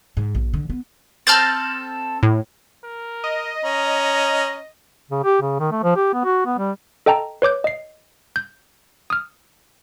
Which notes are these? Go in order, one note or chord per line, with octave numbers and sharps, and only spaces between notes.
G#2
A#1
D3
B3
C4 A4 F6 G6 A6
A2
A#4
D#5
C#4 A#5
C#3
G4
C#3
D#3
A3
F3
G4
B3
F#4
B3
G3
A4 D#5 G5 A5 A#5
B4 C#5 D6 G6
D#5 C7
G6
D#6 F6